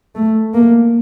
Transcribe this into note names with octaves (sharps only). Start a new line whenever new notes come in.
A3
A#3